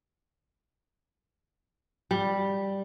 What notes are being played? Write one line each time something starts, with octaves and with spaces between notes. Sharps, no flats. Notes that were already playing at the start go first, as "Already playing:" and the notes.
G3